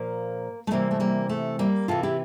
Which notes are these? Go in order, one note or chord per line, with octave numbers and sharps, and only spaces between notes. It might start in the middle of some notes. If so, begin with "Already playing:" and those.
Already playing: A#2 F3 A#3
A3
C3 E3 G3 A#3
A3
G3 A#3
A3
G3 A#3
C3 E3 F4 A4
E4 G4